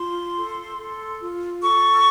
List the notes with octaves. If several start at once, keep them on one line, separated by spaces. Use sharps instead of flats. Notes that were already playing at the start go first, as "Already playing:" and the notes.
Already playing: F4 C6
A4
A4
F4
A4 C#6